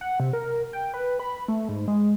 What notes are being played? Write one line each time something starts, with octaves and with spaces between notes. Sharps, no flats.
F#5
C3
A#4
G5
B4
B5
A3
G#2
G#3